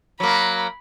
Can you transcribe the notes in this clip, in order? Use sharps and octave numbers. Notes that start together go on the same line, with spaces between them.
F#3 A#3 B5